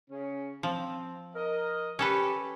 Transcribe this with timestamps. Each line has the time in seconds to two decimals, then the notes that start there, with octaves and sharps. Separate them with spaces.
0.11 C#3 C#4
0.63 F3 C4
1.35 A#4 D#5
1.99 C#4 G4 A4 B4